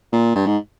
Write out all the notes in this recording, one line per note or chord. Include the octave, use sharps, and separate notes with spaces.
A#2
G2
G#2